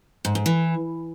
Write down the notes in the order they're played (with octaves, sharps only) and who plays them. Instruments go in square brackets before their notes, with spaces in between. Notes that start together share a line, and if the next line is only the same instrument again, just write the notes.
[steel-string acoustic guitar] G#2
G#2
E3